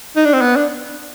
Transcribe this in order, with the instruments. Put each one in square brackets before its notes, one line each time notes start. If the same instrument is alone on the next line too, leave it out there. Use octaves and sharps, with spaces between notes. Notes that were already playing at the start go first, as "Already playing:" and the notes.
[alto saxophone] D#4
D4
C4
B3
D4